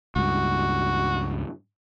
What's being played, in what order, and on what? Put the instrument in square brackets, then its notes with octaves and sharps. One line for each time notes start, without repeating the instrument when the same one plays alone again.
[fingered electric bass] C#2 G2 [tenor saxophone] F#4